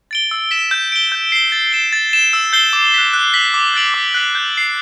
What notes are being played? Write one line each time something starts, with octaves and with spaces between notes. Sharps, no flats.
A6 D7 G7
E6
B6 E7 G7
G6
D7 G7
G6
C7 G7
A6
E7 G7
A6
E7 G7
E6
G6 C7 G7
D6
F#6 B6
F#6
B6 F#7
D6
F#6 A6 D7 F#7
D6
F#6 B6 F#7
G6
C7 F#7